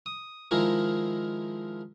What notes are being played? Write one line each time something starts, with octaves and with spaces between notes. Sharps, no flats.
D#6
D#3 F3 G#3 E4 G#4 A#4